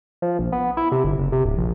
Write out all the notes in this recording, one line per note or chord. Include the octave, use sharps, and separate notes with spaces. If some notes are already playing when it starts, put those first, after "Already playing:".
F3
A#1
B3
E4
C3
G1
F#1
C3
D1
A#1